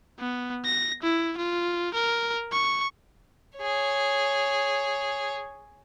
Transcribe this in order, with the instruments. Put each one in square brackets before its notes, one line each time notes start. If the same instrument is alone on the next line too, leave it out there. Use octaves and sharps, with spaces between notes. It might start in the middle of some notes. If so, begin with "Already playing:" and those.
[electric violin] B3
A#6
E4
F4
A#4
C#6
[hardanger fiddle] G#4 C#5